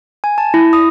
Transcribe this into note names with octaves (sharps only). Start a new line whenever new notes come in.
G#5
A5
E4
D#6